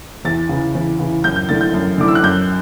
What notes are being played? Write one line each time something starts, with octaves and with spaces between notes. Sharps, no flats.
E2 A6
C#3 E3
E2
C#3 E3
F#2 G6
G6
D3 A3 E4 A6
G6
F#2
D3 A3 E4 D6
E6
F#6
F#2 G6